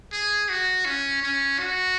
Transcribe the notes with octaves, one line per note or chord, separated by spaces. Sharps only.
G#4
F#4
C#4
C#4
F#4